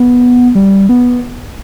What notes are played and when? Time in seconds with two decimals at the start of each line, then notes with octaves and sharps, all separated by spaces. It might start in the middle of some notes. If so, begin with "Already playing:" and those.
Already playing: B3
0.55 G3
0.89 B3